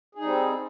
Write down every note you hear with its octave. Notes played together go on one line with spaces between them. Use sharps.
G3 C4 D#4 G#4